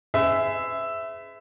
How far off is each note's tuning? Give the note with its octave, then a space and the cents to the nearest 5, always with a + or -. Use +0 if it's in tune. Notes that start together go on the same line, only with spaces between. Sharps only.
G#4 +0 B4 +45 E5 +0